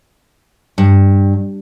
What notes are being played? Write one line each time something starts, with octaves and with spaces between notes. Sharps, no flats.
G2